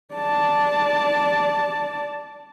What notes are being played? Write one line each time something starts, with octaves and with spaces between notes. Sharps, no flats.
D5 A5